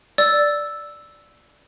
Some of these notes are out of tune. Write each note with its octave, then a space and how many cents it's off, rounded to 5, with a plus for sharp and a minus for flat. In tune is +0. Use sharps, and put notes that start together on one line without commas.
D5 +0 E6 +0